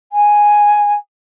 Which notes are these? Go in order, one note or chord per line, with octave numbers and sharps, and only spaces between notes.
G#5